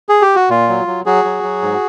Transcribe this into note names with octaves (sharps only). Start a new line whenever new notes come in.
G#4
G4
F#4
A#2 F4
F#3
F#3
F#3 F#4 G#4
F#3
F#3
G#2